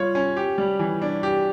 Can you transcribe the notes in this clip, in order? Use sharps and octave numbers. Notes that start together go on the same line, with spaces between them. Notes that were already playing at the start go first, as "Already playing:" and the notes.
Already playing: G3 F4 C#5
C#4
G4
G3
E3
D4
G4